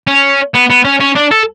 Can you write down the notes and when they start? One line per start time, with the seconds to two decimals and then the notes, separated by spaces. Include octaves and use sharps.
0.07 C#4
0.54 B3
0.70 B3
0.84 C#4
1.00 C#4
1.16 D4
1.31 A4